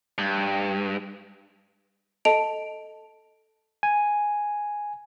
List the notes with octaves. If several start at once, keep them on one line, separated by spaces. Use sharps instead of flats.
G2
A4 D#5 A5 D7 F7
G#5